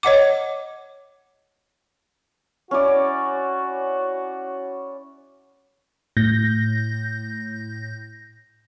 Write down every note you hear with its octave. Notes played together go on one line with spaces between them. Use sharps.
C#5 D#5 F#5 D6
C#4 E4 F#4 D5
A2 G6 A#6